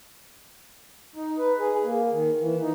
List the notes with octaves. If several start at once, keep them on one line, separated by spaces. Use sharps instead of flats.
D#4
B4
G#4
A#3
D#3
E3
D#4